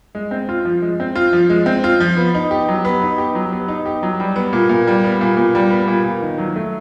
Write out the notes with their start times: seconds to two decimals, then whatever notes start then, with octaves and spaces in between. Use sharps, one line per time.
0.15 G#3
0.31 C4
0.49 F4
0.65 F3
0.82 G#3
1.00 C4
1.16 F4
1.33 F3
1.50 G#3
1.66 C4
1.84 F4
2.00 F3
2.17 B3
2.34 D#4
2.51 G4
2.68 F#3
2.85 B3
3.02 D#4
3.18 G4
3.35 F#3
3.52 B3
3.68 D#4
3.86 G4
4.03 F#3
4.20 G3
4.36 B3
4.53 A#2
4.69 A#2
4.87 G3
5.04 B3
5.21 A#2
5.37 A#2
5.55 G3
5.70 B3
5.88 A#2
6.04 A#2
6.22 D#3
6.38 F#3
6.56 A3